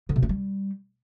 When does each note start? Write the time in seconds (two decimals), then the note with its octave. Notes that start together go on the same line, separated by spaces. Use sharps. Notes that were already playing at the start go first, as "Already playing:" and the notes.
0.09 D3
0.16 B2
0.23 A3
0.29 G3